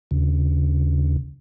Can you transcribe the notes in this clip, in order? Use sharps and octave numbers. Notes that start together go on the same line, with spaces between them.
D#2 C#3